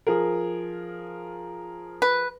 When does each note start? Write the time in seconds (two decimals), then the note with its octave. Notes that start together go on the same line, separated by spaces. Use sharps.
0.07 F3 G#4 A#4
2.02 B4